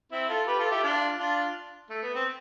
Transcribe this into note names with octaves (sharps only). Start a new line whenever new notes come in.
C4 E4
F4 A4
G4 B4
F4 A4
E4 G4
D4 F4
D4 F4
A3
B3
C4